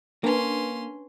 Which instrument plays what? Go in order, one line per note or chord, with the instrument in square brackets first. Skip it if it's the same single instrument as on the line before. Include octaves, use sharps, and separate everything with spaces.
[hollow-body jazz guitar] A#3 [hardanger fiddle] C#4 C6 [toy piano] D4 B4 A5